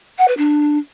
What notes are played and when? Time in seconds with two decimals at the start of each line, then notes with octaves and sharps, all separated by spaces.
0.18 F#5
0.28 B4
0.38 D4